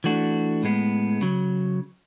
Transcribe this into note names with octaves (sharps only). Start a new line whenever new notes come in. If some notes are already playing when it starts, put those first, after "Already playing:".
E3 A3 D4 F#4
A2 G#3 B3
C#3 F#3